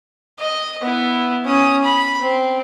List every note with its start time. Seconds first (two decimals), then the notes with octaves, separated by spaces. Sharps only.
0.39 D#5
0.82 B3 E4
1.46 C#4 D#6
1.83 B5
2.21 C4